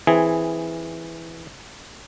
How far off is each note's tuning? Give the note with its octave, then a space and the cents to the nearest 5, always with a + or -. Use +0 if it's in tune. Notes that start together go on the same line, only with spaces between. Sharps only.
E3 +0 C4 +5 G#4 +0